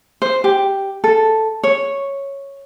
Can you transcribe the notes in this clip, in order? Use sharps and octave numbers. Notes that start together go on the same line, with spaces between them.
C5
G4
A4
C#5